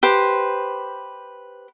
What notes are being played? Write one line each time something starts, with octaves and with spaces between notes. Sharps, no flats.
G4 B4 C5